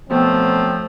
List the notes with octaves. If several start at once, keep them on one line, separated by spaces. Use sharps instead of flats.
B2 F3 F#3 A3 C4